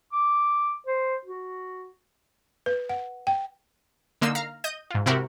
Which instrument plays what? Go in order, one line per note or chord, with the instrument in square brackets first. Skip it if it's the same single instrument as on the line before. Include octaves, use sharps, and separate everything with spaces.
[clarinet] D6
C5
F#4
[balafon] B4
F#5
G5
[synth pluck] D3 A#3 D#4 C6 E6
F5 A#5 F6
D#5 G6 D#7
G#2 F4
C3 C4 E4 F#4 G4 A#4